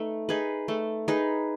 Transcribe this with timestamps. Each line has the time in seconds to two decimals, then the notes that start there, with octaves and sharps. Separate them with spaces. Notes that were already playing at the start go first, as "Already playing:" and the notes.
Already playing: A3 D#4 B4
0.29 D#4 G#4 B4
0.68 A3
1.08 D#4 G#4 B4